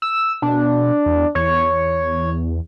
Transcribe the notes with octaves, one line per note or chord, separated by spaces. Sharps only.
E6
B2 D4
E2
E2 C#5